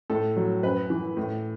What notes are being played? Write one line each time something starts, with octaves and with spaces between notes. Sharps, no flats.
A2 A4
F#3
F#2 B4
E3
A2